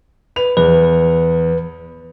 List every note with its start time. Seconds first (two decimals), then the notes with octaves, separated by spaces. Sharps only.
0.36 B4 F7
0.57 E2 B4